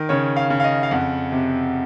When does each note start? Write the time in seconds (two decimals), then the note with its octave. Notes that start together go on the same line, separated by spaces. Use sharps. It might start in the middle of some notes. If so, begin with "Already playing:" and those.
Already playing: D#3
0.09 C#3 C#5
0.36 F5
0.50 C#3
0.60 F5
0.64 D#5
0.83 F5
0.91 F2 F#5
1.32 C3